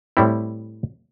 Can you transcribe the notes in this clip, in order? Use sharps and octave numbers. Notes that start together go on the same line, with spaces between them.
A2 G3 C4 E4